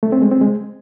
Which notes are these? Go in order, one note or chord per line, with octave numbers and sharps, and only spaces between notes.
A3
C4
G#3
C4
G#3